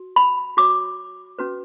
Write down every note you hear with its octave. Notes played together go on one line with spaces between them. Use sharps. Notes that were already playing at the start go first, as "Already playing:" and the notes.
Already playing: F#4
B5
F#4 C#5 D6
C#4 F#4 B4